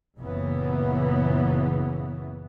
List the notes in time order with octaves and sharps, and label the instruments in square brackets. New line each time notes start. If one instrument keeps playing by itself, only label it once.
[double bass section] F#1 A#2 C#3 E3 B3